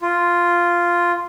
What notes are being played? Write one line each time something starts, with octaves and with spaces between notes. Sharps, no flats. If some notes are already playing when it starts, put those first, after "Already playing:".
F4